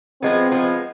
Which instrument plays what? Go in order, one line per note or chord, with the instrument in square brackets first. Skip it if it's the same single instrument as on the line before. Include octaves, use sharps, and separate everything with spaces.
[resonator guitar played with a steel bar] F3 G#3 B3 [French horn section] C4
[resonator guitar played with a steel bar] F3 G#3 B3